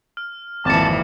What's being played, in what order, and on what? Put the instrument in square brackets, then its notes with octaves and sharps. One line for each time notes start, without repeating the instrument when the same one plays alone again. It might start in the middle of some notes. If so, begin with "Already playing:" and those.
[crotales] F6
[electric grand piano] G#1 F2 [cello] A#2 E3 [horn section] A5 [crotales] D6 C#7